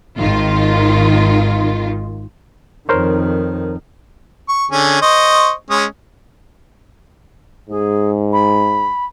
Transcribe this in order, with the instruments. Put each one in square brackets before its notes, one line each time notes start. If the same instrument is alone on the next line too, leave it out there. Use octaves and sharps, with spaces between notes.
[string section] G#1 D#3 F4
[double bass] F2 D#3 [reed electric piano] A#4 C5 C#5
[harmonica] C#6
D3 C#4 G#4
C5 D#5 C#6
G#3 C#4 D#6
[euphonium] G#2 [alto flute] G#4
[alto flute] B5